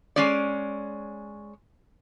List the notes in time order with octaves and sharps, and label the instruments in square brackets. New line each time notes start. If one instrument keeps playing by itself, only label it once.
[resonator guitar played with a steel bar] G#3 C#4 D5